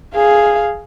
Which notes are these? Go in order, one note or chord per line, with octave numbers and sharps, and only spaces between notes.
G#4 F5